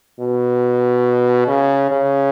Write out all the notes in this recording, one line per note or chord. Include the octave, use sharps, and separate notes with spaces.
B2
C#3
C#3